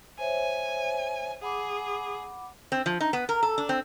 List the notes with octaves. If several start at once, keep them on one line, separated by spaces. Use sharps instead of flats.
C5 C#5 E5 G#5
G#4 F#5 B5 D6
C4
F3
D#4
B3
A#4
A4
D4
C4